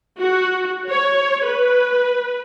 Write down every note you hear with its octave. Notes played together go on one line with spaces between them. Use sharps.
F#4
C#5
B4